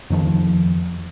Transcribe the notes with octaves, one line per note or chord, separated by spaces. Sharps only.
F2 D#3 F3